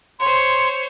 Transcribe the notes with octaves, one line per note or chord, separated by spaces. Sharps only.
C5 C#5 C6